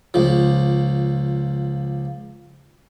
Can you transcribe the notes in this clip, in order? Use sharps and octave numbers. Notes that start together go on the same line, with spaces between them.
C#2 F3